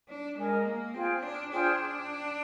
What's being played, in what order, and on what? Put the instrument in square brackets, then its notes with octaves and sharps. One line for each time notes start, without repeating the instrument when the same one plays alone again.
[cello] D4
[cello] G#3 [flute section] A#4 D#5 G#5
[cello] A#3
[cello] C4 [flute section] F4 G#4 C5 G5
[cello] D4
[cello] D4 [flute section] F4 G#4 C5 G5